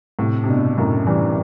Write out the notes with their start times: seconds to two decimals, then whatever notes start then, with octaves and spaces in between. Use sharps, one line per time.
0.19 A2 C3
0.44 C3
0.48 G2 B2
0.78 F#2 A2
1.07 E3 G3